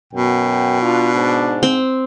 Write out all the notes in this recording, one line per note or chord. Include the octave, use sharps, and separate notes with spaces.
F#2 B2 G5
D4 F4
G#2
C4